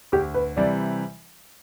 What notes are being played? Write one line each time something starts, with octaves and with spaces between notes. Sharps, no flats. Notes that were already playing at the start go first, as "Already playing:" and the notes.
D2 G4
B4
C3 E3 G3 D5